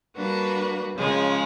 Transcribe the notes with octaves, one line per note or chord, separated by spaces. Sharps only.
G3 A#3 D4 F#4 B4
C#3 F3 G#3 C#4